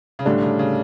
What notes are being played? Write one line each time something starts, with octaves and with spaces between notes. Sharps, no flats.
C#3
A2 D3 G3 D4
C#3
C#3